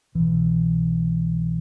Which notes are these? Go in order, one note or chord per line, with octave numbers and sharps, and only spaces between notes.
C2 B2 E3